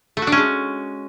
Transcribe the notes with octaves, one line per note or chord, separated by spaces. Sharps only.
A3
F#4
D4
C#4
G#3